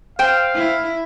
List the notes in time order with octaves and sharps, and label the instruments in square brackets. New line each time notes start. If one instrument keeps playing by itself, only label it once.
[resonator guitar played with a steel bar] C5 G5 [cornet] F5
[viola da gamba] E4